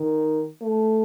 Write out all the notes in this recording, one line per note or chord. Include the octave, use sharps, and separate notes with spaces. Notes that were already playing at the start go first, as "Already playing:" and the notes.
Already playing: D#3
A3